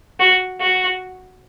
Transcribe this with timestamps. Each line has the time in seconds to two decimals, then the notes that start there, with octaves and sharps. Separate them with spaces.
0.20 F#4
0.61 F#4